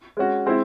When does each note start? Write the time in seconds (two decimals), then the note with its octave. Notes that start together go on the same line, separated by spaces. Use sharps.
0.17 G#3 C#4 F#4
0.46 G#3 C4 E4